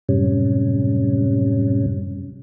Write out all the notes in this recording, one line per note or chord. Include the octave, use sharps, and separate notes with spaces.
F#2 A2 C3 G3 C#4